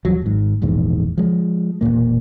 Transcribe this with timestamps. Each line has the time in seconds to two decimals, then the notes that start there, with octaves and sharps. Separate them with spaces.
0.05 D#2 F3 F#3
0.22 G#1 G#2
0.62 E1 A#1 E2 G#2
1.18 F3 G#3
1.81 E1 D#2 A#2 A#3